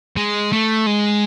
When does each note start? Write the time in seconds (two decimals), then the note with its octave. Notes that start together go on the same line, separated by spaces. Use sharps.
0.17 G#3
0.53 A3
0.87 G#3